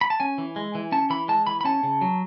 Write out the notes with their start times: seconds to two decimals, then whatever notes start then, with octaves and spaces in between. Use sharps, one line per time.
0.01 B5
0.10 A5
0.20 C#4 G#5
0.38 E3
0.56 G#3
0.75 E3
0.92 C#4 A5
1.10 E3 B5
1.28 G#3 A5
1.47 E3 B5
1.61 B5
1.65 C#4 A5
1.83 C#3
2.01 F#3